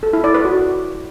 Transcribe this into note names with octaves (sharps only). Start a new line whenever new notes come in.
A4
E4
D5
B4
F#4